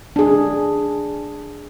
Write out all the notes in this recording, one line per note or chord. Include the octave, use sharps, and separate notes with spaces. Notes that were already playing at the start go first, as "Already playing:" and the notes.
D4 G#4